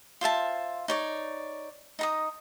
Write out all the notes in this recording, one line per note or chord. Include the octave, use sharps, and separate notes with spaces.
F4 C5 E5 A5
D#4 C#5 D5
D#4 A#5 D#6